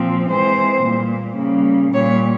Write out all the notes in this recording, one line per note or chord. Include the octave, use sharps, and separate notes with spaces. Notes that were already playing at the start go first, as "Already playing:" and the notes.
Already playing: A#2 F3 C4
E3 G#3 C4 C5
A#2 G3 A#3
C#3 G3 A#3
A#2 G3 A#3 C#5